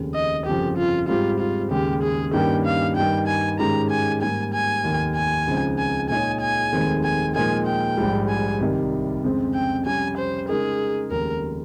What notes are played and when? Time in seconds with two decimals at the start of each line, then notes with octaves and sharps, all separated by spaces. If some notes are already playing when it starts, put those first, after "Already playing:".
Already playing: F1 D#2 C#3
0.14 D#5
0.46 G1 F2 C#3 F3 G4
0.77 F4
1.08 G#2 G3 C4 F4 G4
1.40 F4
1.71 D#2 C#3 G#3 G4
2.03 G#4
2.33 G2 D#3 A#3 C#4 G4 G5
2.65 F5
2.96 G2 D#3 G3 G5
3.27 G#5
3.59 G#2 D#3 G#3 C#4 G4 A#5
3.90 G#5
4.21 G#2 G3 A#3 G#5
4.54 G#5
4.84 F1 D#2 D#3 A#3
5.16 G#5
5.47 C#2 C#3 F3 C4 D#4
5.79 G#5
6.10 A#2 G#3 D#4 G#4 C#5 G#5
6.41 G#5
6.72 F1 D#2 D#3 G#3 C4
7.04 G#5
7.35 A#2 F3 G#3 D#4 A#4 G#5
7.67 G5
7.97 A#1 G#2 G3
8.29 G#5
8.61 C2 C3 D#3 G3
9.24 F2 C#3 G#3 C4
9.54 G5
9.86 F2 C3 G3 C#4 G#5
10.17 C5
10.49 C#3 G#3 D#4 G#4 A#4
11.11 F1 D#2 C#3 G#3 A#4